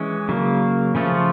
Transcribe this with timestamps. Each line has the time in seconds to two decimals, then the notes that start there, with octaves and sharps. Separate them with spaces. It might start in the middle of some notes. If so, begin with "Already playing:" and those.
Already playing: E3 G#3 C#4
0.29 C#3 F#3 A#3
0.95 C#3 F3 A3 C#4 F4